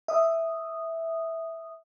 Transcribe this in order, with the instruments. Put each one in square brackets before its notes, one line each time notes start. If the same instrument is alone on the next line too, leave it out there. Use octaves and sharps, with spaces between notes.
[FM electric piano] E5 D#6